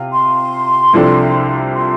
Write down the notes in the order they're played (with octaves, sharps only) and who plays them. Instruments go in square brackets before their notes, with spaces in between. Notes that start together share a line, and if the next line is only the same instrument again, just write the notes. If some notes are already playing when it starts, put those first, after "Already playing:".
Already playing: [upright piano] C3 F4
[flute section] C6
[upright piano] C2 C3 F3 D4 A4
[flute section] C6